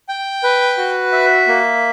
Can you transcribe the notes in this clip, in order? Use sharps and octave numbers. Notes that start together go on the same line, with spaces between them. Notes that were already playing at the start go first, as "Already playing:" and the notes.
G5
B4
F#4
E5
A#3